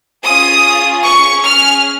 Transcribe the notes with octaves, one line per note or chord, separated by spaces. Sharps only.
C#4 F4 G#4 D#6
C#4 G#4 C#6
F6